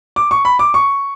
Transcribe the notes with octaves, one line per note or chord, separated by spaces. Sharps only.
D6
C#6
B5
D6
C#6